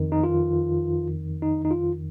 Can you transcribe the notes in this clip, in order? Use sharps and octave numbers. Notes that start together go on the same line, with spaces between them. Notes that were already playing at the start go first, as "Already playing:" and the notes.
Already playing: F2 D#3
D#4
F4
D#4
D#4
F4